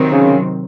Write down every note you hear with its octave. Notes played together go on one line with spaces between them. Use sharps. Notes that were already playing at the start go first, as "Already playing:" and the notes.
Already playing: C3 D#3 F#3 C4
C#3